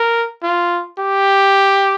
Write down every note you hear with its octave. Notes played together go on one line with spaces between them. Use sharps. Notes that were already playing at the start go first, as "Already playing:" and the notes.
Already playing: A#4
F4
G4